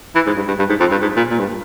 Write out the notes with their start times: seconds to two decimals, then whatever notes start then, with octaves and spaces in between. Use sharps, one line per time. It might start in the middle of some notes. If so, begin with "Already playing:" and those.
0.15 E3
0.26 G#2
0.37 G2
0.47 G2
0.59 G2
0.69 G#2
0.80 F2
0.91 G2
1.02 G#2
1.16 A#2
1.30 A#2
1.39 G2